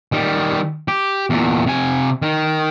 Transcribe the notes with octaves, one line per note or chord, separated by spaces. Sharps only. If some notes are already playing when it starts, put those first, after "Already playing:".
D#3 G3
G4
E2 A#2
C3 G#5
D#3